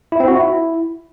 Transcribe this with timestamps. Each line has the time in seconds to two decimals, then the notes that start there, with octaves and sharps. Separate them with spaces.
0.12 E4
0.20 C4
0.28 F#4
0.36 E4